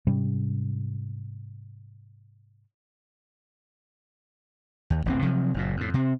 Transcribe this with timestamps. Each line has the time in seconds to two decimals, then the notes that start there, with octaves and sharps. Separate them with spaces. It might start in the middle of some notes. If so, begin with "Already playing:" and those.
0.07 G#2 C3 G3 C#4
4.90 D#2
5.05 E1 A1 C4
5.22 C3 F3 F#3
5.54 F#1 F#2 A#2
5.77 F2 A2
5.94 C3 C4